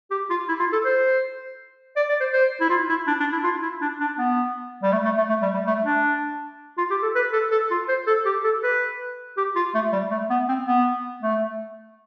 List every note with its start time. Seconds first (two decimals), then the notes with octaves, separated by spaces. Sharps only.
0.11 G4
0.30 F4
0.48 E4
0.60 F4
0.72 A4
0.85 C5
1.97 D5
2.09 D5
2.20 C5
2.33 C5
2.61 E4
2.70 F4
2.89 E4
3.07 D4
3.20 D4
3.33 E4
3.44 F4
3.62 E4
3.82 D4
4.00 D4
4.19 B3
4.83 G3
4.93 A3
5.05 A3
5.18 A3
5.30 A3
5.42 G3
5.54 G3
5.67 A3
5.85 D4
6.78 F4
6.90 G4
7.03 A4
7.15 B4
7.33 A4
7.51 A4
7.71 F4
7.89 C5
8.07 A4
8.26 G4
8.44 A4
8.63 B4
9.37 G4
9.56 F4
9.74 A3
9.92 G3
10.11 A3
10.30 B3
10.49 C4
10.67 B3
11.23 A3